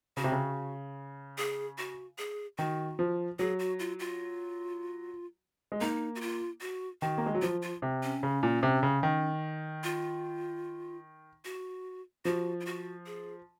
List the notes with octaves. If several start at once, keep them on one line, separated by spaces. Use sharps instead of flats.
C#3 F#4
C3
C#3
G#4
F#4
G#4
D#3 F#4
F3
F#3 G#4
F#4
F4
F4
G#3
A#3 D#4
F#4
F4
F#4
D#3 F#4
A#3
G#3
F#3
F3 F4
F4
C3
C#4
C#3
A#2
C3
C#3
D#3
F4
F#4
F3 F#4
F4
F#4
G#4